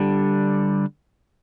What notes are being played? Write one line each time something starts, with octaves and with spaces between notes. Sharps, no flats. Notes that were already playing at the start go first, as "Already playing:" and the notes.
Already playing: D3 G3 D4